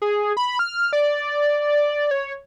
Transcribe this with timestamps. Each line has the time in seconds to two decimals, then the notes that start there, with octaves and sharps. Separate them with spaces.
0.02 G#4
0.37 B5
0.59 F6
0.93 D5
2.11 C#5